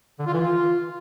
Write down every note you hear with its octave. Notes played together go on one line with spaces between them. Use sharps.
D3
F4
E3
F4